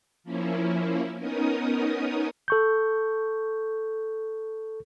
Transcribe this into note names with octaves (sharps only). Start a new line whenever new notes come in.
F3 A#3 C#4 E4
B3 C#4 D#4 A#4 D#6
A4 C#6 G6